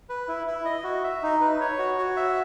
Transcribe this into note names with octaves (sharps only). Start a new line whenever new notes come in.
B4
E4
E4
D#5
F#4
E5
D#4
B4
C#5
F#4
F#4
E5